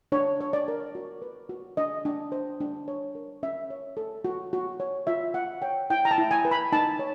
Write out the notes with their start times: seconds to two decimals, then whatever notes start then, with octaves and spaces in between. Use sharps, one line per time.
0.12 D4 C#5
0.41 C#5
0.53 D5
0.68 A#4
0.95 F#4
1.22 B4
1.49 F#4
1.77 D4 D#5
2.05 D4
2.32 C5
2.60 D4
2.88 C#5
3.15 A#4
3.43 C#4 E5
3.70 C#5
3.97 A4
4.25 F#4
4.53 F#4
4.80 C#5
5.07 F4 E5
5.34 F4 F#5
5.62 C#5 G5
5.90 E4 G5
6.05 A#5
6.11 A5
6.18 E4
6.31 G#5
6.45 B4
6.51 B5
6.72 D#4 A5
6.99 C#5